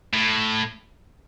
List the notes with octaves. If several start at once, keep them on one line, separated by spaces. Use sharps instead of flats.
A2